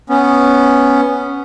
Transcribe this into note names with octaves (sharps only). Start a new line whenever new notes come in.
B3 C#4